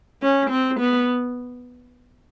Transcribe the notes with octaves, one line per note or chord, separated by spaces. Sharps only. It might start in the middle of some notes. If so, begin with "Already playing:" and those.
C#4
C4
B3